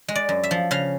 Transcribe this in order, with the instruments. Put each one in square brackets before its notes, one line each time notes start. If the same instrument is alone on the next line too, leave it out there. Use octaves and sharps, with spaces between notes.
[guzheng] G#3
D5
F#2
E5
F3
C#3 F5